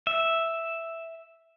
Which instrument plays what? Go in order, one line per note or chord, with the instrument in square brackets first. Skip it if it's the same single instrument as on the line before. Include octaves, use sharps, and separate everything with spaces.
[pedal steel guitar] E5